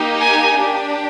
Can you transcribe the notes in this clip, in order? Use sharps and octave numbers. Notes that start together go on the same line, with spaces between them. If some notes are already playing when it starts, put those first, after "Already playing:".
Already playing: A#3 D#4 G4
G#5
D4 G4